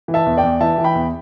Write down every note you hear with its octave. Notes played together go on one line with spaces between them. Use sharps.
E3
E5 A5
E2
D5 G5
E2
E3 E5 A5
E3
G5 B5
E2